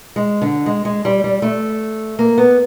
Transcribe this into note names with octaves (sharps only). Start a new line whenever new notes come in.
G#3
D3
G#3
G#3
G3
G3
A3
A#3
B3